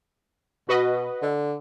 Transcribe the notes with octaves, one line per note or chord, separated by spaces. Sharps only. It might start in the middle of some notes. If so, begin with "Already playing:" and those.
B2 F#4 B4 D#5
D3